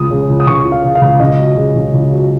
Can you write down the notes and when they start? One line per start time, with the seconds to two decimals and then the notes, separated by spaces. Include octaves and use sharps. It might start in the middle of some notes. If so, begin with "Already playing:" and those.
Already playing: C#2 F3 D#6
0.11 C#3
0.29 C#2
0.40 D#6
0.47 C#2 C#6
0.65 F3
0.72 F5
0.84 C#3
0.95 F5
1.01 C#2
1.20 C#2 D#5
1.39 F#3
1.56 C#3
1.75 C#2
1.94 C#2
2.12 F#3